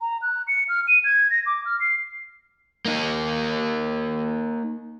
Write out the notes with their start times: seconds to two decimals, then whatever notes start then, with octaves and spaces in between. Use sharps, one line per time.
0.01 A#5
0.22 F#6
0.48 C#7
0.69 F6
0.88 D#7
1.04 G#6
1.31 A#6
1.46 D6
1.65 F6
1.80 C7
2.85 A#3 D#4